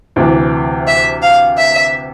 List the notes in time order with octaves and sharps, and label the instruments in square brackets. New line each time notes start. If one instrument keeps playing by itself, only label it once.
[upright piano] D2 C3 E3
[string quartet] E5
F5
E5